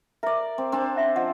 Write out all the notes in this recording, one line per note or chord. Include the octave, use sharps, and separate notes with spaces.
A#4 D5 E5
C4
C4 D4 A5
C#4 E5 C6
F3 D#5 F#5